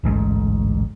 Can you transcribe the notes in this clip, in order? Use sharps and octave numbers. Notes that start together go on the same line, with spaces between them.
D1 A1 G#2